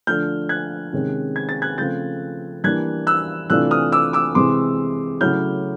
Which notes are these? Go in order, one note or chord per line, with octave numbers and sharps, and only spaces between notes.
D3 F3 A3 D4 F6 G6
F#6 G#6
C3 D#3 G#3 C#4
G#6
A6
F#6 G#6
C#3 F3 A3 C4 F4 G6 A6
E3 G3 A#3 D4 F#6 G#6
E6 F#6
C3 E3 A3 D4 F4 E6 F#6
D#6 F6
D6 E6
D6 E6
C3 E3 G#3 C4 C6 D6
C#3 F#3 A3 C#4 E4 F6 G6